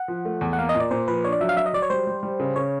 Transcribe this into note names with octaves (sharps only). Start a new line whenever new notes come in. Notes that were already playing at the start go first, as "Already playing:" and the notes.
Already playing: F#5
F3
A3
E2
F#5
A#3 F5
D#5
A#2
D5
A#2 C5
F3 B4
D4 C#5
D5
F#3 E5
F5
F#3 E5
D#5
F#3 D5
C#5
G3 C5
G3
G3
C#3
C#3 C#5